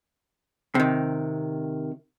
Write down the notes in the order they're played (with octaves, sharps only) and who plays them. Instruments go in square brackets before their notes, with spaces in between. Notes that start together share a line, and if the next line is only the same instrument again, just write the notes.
[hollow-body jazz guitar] C3 D#3